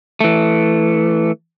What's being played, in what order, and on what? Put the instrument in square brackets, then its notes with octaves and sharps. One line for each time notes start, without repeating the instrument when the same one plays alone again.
[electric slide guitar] E3 A3